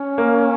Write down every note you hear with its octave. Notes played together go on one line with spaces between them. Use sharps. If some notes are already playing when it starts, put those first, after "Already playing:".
Already playing: C#4
A#3